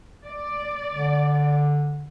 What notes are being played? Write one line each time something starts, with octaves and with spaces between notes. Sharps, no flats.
D5
D3